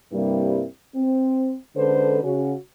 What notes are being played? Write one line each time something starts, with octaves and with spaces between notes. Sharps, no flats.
G2 C3 G3 A#3 C4 E4
C4
D3 G#3 C#4 A4 B4 C5
C#3 C#4 F#4